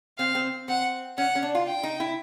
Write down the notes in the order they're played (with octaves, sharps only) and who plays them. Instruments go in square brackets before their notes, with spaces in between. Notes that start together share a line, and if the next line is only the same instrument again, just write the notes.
[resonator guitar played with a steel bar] C4 [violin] F5
[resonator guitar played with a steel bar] C4
[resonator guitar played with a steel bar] C4 [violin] F#5
[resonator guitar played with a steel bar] C#4 [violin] F#5
[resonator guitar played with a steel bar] C#4
D4
F4
[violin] G5
[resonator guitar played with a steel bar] D#4
E4